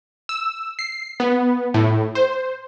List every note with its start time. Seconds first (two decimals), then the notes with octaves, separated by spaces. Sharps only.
0.29 E6
0.79 C7
1.20 B3
1.74 A2
2.15 C5